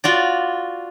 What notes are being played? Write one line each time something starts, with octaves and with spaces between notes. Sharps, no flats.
F4 F#4 D5